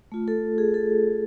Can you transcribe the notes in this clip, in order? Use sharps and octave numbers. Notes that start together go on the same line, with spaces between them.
A3 F4
A4
G#4
A4